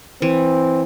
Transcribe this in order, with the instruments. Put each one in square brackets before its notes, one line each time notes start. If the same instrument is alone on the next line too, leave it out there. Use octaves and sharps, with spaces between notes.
[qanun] E3 [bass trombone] C4